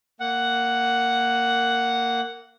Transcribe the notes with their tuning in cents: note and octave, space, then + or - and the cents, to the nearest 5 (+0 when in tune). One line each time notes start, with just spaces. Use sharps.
A#3 -15 F#5 +5